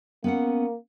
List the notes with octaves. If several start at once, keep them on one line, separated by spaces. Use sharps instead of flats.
A#3 B3 C#4 F#5